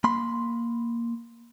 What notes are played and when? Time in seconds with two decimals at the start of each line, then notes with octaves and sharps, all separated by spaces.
0.04 A#3 B5 C6